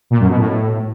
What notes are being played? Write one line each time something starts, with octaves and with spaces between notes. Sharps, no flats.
A#2
F#2
B2
A2